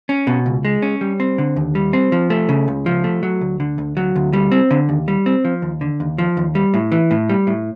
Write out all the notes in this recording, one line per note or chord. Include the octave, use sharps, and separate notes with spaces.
C#4
B2
C#2
G#3
C#4
G3
C4
D3
D#2
G3
C4
F3
A3
C#3
C#2
F3
A3
F#3
D2
D3
D2
F#3
D2
G3
C4
D3
D#2
G3
C4
F3
D#2
D3
D#2
F3
D#2
G3
A2
E3
A2
G3
A2